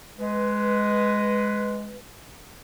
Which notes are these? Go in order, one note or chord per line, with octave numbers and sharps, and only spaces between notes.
G#3 B4